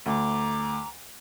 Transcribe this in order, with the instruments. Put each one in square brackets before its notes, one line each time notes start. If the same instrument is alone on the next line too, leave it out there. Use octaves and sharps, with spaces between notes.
[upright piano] D2 [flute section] A#5 D6